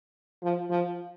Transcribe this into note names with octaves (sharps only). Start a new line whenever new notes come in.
F3
F3